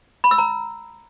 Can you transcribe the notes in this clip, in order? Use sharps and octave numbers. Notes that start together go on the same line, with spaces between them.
B5
E6
A#5